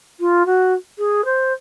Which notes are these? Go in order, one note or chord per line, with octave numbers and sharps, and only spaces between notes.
F4
F#4
G#4
C5